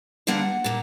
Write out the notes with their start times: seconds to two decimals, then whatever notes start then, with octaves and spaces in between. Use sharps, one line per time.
0.27 D3 G3 A#3 D4 F#5
0.64 A#2 A#3